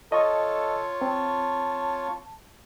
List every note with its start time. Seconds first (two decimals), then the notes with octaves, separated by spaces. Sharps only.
0.12 F4 A4 C#5 D#5 A5 C#6
1.02 C4 A5